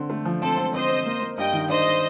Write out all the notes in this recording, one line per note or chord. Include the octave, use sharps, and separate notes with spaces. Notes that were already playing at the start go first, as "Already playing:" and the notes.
Already playing: D3 C4
A3
F3
C4 A4 C5
C4
C4 C5 D#5
C4
A#3
A#3
G2 D#5 G5
D#3
D4 C5 D#5
D4